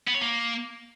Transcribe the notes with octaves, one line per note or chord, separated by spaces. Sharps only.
B3
C#5
A#3